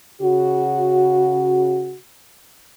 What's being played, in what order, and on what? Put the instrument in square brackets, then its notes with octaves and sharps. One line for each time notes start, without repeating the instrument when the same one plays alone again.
[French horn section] C#3 F#4